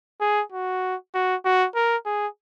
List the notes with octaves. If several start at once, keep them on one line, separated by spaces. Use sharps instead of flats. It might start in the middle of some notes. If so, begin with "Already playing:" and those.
G#4
F#4
F#4
F#4
A#4
G#4